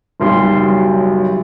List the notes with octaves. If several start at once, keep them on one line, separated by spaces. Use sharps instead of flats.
F#1 B1 G3 C6
F#3